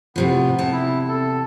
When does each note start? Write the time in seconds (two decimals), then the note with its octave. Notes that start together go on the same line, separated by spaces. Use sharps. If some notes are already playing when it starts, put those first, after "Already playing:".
0.16 A2 C3 F3 B3
0.58 E2 C3 A5
0.73 E4
1.08 A4